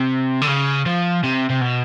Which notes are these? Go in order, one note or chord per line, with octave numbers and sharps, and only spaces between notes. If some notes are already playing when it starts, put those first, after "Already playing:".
Already playing: C3
D3
C#3
F3
C3
C3
B2